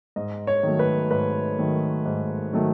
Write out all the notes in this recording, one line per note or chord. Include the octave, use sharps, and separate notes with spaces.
G#2 D#5
C#5
D#3 F#3 A3
B4
G#2 B4
D#3 F#3 A3
G#2
D#3 F#3 A3